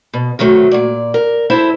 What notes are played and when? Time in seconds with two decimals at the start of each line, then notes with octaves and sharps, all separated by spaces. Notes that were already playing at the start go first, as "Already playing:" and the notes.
0.14 B2
0.39 C3 D#3 F#3 A3
0.71 A#2 D5
1.14 A#4
1.50 E4 A4 C5 E5